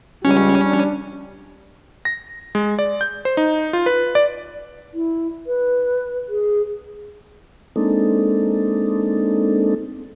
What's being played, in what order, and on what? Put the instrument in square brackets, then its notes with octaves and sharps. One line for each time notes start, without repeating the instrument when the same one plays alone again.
[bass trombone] C#2 [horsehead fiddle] G3 [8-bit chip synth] C#4
[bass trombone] D4
[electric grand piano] A#6
G#3
D5
G6
C5
D#4
F4
B4
D5
[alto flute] E4
B4
G#4
[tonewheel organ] G#3 A#3 C4 D4 D#4 A4